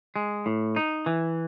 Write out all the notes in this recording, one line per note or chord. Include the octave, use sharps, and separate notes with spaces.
G#3
A2
D#4
E3